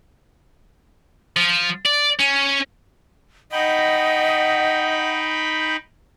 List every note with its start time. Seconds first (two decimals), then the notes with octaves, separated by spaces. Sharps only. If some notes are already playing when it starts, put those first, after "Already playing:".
1.37 F3
1.86 D5
2.20 C#4
3.52 D#4 D#5 F#5 G5 B5